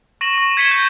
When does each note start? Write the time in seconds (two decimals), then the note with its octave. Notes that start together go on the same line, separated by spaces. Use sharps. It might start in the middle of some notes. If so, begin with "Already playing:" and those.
0.21 C#6 A#6 E7 F#7
0.38 C#6
0.57 G#6 B6 C#7 D#7 E7 G7
0.71 G6